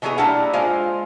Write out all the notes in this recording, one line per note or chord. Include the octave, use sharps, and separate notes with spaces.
B2 E3 F#3 A3 A#3 G#4
G3 A#3 D4 E4 F#5
G#3 F4 C5 F5